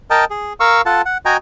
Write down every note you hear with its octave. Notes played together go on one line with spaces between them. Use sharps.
A#4 D#5 G5 A5
G#4
A#4 F5 C#6 E6
F4 A4 F#5 A5
F#5
F#4 D#5 G5 G#5 A#5